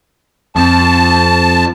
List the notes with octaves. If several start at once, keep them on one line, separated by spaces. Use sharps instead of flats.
F2 A5